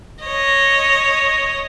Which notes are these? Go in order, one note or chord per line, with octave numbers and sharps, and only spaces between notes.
C#5 D#5